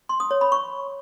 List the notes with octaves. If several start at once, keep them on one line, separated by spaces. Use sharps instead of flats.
C6
D#6
C#5
B5
C#6